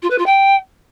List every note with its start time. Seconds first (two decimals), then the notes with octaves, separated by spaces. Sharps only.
0.02 F4
0.10 B4
0.18 F4
0.26 G5